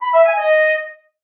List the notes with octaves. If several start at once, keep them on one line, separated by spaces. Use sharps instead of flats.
B5
E5
G#5
D#5